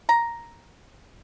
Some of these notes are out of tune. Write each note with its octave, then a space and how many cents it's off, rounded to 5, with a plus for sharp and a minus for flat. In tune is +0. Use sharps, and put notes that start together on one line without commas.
A#5 +5